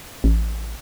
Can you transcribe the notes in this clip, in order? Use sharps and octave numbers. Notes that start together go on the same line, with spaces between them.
A1